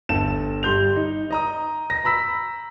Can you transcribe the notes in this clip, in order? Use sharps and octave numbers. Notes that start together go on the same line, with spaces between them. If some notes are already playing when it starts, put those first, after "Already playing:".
G1 A4 E7
G3 C6 G6 F7
D#4
D#5 A#5 D#6
A#6
A#5 B5 E6 B6